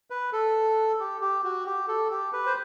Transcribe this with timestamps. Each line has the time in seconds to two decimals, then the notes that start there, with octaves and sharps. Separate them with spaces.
0.10 B4
0.32 A4
1.00 G4
1.21 G4
1.44 F#4
1.66 G4
1.88 A4
2.10 G4
2.33 B4
2.46 C5